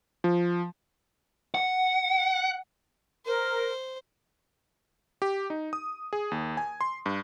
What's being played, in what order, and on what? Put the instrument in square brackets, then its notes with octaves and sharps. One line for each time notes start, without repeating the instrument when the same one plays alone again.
[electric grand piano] F3
[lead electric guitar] F#5
[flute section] A#4 [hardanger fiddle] C5
[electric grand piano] G4
D#4
D#6
G#4
D#2
G#5
C6
G2